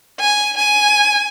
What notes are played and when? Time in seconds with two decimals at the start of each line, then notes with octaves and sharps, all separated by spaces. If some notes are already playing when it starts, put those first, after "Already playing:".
0.20 G#5
0.57 G#5